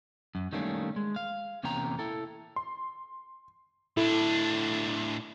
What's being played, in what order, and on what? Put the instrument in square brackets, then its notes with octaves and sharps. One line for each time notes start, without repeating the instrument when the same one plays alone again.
[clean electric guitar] F#2
D#3 G3 A3 A#3 C#4 D4
G#3
F5
E2 C3 A#3 C#4 G5 A#5
E4 A4
[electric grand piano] C6
[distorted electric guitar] A2 D4 [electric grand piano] E4 A4